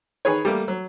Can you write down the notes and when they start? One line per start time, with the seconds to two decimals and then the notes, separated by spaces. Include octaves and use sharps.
0.25 D#3 G#4 B4 C#5
0.45 G3 A3 A#3
0.68 F#3